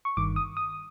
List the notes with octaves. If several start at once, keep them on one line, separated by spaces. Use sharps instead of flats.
C#6
G1 G2 D#3 D6
D#6
D#6